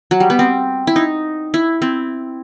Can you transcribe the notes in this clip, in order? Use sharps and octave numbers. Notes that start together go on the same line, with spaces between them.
F#3
G3
B3
C4
E4
D#4
E4
C4